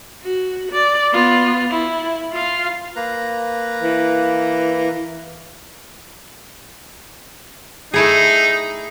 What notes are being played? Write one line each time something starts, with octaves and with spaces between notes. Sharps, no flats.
F#4
D5
B3 F4
E4
F4 F5
A#3 B4 A#5
E3
A3 D#4 E4 G#4